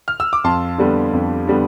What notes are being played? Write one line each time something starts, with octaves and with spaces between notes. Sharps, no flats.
F6
E6
D6
F2 A5 C6
D3 G3 B3
F2
D3 G3 B3